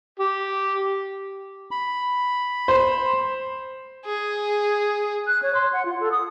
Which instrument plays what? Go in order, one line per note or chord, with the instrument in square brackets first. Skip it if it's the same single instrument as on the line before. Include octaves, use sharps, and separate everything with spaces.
[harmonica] G4
[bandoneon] B5
[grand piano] C5
[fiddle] G#4
[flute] F#6
C#5
C6
F#5
F4
A4
D#6